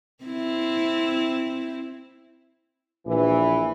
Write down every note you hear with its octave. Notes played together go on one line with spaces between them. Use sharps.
C4 E4
A#1 E3